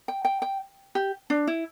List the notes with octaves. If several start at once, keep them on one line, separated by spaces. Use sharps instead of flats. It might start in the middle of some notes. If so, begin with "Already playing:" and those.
G5
G5
G5
G4
D4
E4